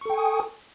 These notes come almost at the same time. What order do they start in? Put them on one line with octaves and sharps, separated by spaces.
C#6 A4 G5 G#5 D#6